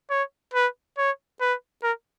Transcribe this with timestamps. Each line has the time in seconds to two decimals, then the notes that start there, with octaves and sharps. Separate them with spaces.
0.10 C#5
0.54 B4
0.98 C#5
1.41 B4
1.83 A#4